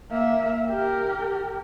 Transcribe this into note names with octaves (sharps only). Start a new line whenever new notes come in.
A#3 E5
G4 A#4